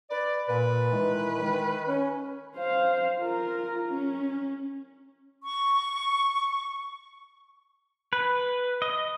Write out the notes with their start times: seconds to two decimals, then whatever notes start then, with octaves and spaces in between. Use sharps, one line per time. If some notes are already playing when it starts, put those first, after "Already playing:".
0.11 B4 D5
0.48 A#2 B4
0.91 D#3 E3 G#3
1.41 D#3
1.87 C#4
2.56 C5 F5
3.19 F4 A#4
3.88 C#4
5.43 C#6
8.13 B4
8.82 D#5